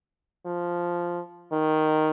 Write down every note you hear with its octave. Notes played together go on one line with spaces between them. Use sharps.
F3
D#3